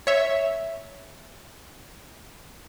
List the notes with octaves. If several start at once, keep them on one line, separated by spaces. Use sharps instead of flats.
C#5 E5